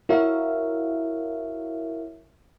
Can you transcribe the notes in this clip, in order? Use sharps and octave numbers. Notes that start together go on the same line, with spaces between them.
E4 F#4 A#4 C#5 E5 F5